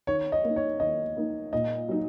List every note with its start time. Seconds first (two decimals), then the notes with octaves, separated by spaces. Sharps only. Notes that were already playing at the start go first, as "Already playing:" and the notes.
0.07 D#3 C#5
0.32 D#5
0.44 A#3 D#4
0.56 C#5
0.80 D#3 D#5
1.17 A#3 D#4
1.53 A#2 D#5
1.88 F#3 D#4